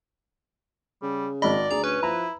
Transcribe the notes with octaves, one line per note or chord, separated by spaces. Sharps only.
C#3 G3
G#1 D5 D#5 B5
D2 G#4 A#5
C#4 B4
F3 E4 A#5